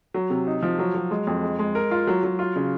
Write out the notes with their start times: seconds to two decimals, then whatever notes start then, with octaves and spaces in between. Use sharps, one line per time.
0.14 F#3
0.30 C3
0.47 D#4
0.63 F3
0.79 F#3
0.95 F#3
1.11 G#3
1.27 F2
1.43 G#3
1.59 G#3
1.75 A#4
1.91 F4
2.07 F#3
2.23 F#3
2.39 F4
2.56 C#3